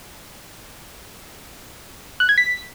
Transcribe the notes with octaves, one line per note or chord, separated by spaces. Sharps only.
F#6
G#6
B6